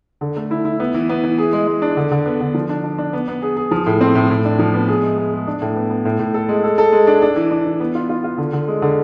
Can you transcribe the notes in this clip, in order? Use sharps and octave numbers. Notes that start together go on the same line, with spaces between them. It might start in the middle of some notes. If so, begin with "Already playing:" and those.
D3
A3
E4
E4
B3
E3
B3
E3
G#4
G#3
G#3
D4
D3
D3
B3
D3
F3
D4
D4
D4
B3
B3
G#4
G#4
F3
A2
C4
A2
A2
D4
F3
B3
G#4
G#3
G#4
G#3
D4
A2
B3
B3
A2
A2
A4
G#3
A4
A4
G#3
D4
D4
E3
D4
E3
B3
F4
F4
F4
D3
D3
G#3
D3